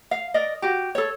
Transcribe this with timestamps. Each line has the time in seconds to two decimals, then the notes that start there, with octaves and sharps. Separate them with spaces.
0.11 F5
0.34 A#4 D5 D#5
0.62 F#4 G4
0.95 A4 C#5